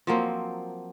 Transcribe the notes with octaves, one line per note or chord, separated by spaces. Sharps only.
F3 F#3 A#3 C4